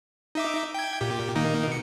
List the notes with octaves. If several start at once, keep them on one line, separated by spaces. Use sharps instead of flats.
D#4 E5 D6
G5 G#6
A#2 G4
D#3 A#3 D#4
B2 C#7